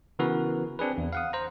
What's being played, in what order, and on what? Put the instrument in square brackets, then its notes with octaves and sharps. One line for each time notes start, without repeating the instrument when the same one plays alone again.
[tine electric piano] C#3 E3 B3 F#4 A#4 B4
C4 D4 G#4 B4
E2
F5 F#5 D#6
C5 A#5